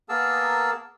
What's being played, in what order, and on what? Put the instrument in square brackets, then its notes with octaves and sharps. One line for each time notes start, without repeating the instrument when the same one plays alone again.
[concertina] A#3 B3 G#4 A#4 A5 E6